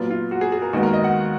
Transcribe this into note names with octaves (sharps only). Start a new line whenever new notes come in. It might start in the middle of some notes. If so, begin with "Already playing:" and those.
Already playing: A#2 F#3 B3 F4
F4
F#4
G#4
G#4
A#4
D#2 D#3 G#3 B3 F#4
A#4
D#5
F#5